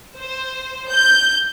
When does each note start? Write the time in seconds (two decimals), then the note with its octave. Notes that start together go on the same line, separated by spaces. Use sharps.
0.19 C5
0.93 G6